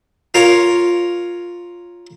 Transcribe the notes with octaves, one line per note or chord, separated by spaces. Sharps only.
F4 A#4 C#5